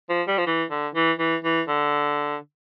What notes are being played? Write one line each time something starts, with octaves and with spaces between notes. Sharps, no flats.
F3
G3
F3
E3
D3
E3
E3
E3
D3